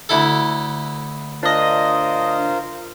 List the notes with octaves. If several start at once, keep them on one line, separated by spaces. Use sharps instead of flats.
D2 E4 A4
D4 F4 A#4 C5 D#5